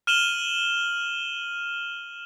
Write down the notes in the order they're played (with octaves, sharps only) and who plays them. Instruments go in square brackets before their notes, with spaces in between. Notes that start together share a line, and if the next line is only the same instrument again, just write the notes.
[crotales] F6 D#7 E7 F#7 G7